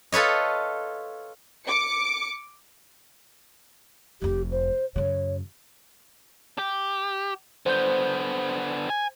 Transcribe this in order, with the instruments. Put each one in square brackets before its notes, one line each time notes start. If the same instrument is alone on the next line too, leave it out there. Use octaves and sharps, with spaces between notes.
[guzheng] F4 A4 B4 C#5 D#5
[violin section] D6 C#7
[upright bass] F1 F2 [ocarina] G4
[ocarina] C5
[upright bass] F#2 C#3 [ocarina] C#5
[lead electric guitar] G4
[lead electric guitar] D3 B3 [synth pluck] C5 G6
[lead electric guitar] G#5